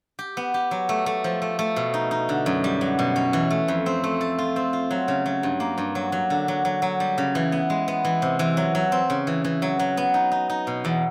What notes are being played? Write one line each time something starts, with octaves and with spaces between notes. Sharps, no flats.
G4
B3
G4
F#3
A3
A3
F3
A3
A3
B2
D#4
D#4
D3
F#2
G3
F#3
B2
C#4
E3
A3
F2
C4
A3
A4
F4
C4
F4
F#3
C#3
F#3
G2
A#3
G2
F#3
F#3
D3
F#3
F#3
F#3
G3
C#3
E3
B3
G#3
B3
E3
C3
E3
F#3
F#3
C4
C#3
E3
E3
F#3
F#3
B3
D#4
D#4
D#4
B2
E2